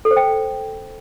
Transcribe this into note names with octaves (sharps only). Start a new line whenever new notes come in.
A4
C5
G5